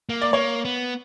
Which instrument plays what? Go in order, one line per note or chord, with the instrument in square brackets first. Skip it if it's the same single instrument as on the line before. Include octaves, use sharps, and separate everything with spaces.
[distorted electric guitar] A#3
[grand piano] D5
[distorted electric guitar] A#3 [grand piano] C#5
[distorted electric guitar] B3